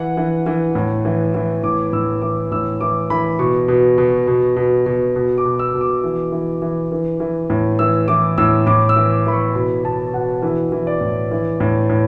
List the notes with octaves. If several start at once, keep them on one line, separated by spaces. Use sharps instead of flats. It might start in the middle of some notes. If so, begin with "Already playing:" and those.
Already playing: E3 F#5
E3
E3
A2
E3
E3
A2 D6
A2 E6
E3 D6
A2 E6
E3 D6
E3 B5
B2 C#6
B2
B2
B2
B2
B2
B2
D6
B2
E6
B2
D6
E3
E3
E3
E3
E3
A2
E3 E6
E3 D6
A2 E6
A2 D6
E6
E3
D6
E3 B5
C#6
B2 B5
B2 A5
B2 F#5
E3 E5
E3
D5
A2
E3
A2
A2